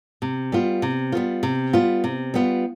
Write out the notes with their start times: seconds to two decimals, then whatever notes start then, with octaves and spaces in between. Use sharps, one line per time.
0.22 C3
0.52 G3 B3 F4
0.82 C3
1.12 G3 B3 F4
1.43 C3
1.73 G3 B3 F4
2.04 C3
2.34 G3 B3 F4